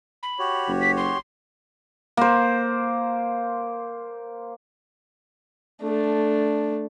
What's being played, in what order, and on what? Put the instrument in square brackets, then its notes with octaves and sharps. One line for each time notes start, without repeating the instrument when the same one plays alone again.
[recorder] B5
[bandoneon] F#4 G4 C#5
[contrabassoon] F#1
[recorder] B6
C6
[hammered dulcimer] A#3 C5
[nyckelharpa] A3 D4